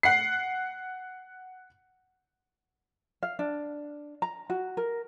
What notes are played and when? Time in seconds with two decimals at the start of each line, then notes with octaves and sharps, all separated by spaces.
0.03 F#5 C7
3.23 F5
3.39 D4
4.22 A#5
4.50 F#4
4.77 A#4